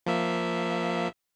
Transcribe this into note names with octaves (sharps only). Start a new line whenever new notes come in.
F3 A#3 E5